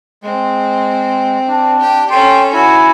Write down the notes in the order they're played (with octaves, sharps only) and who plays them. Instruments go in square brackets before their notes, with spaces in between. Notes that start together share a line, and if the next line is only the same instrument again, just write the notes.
[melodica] G#3 [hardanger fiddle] C4
[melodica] D4
[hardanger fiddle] G4
[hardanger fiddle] C#4 A4 [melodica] G5 C6
[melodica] E4 G#5 [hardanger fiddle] F#4